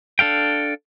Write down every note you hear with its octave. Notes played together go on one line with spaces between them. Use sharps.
D4 A4 F5 G5